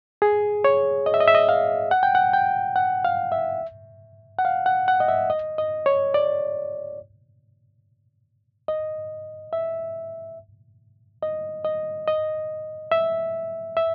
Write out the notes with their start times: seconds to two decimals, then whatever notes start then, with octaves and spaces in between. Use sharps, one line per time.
0.22 G#4
0.64 C#5
1.06 D#5
1.14 E5
1.20 D#5
1.28 E5
1.35 D#5
1.49 F5
1.91 F#5
2.03 G5
2.15 F#5
2.33 G5
2.76 F#5
3.04 F5
3.32 E5
4.39 F#5
4.45 F5
4.66 F#5
4.88 F#5
5.00 D#5
5.08 E5
5.30 D#5
5.58 D#5
5.86 C#5
6.14 D5
8.68 D#5
9.53 E5
11.23 D#5
11.65 D#5
12.08 D#5
12.92 E5
13.77 E5